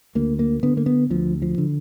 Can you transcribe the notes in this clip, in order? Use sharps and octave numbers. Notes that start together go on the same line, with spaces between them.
D2 A#3
A#3
D3 B3
A#3
B3
D2 F3
F3
D3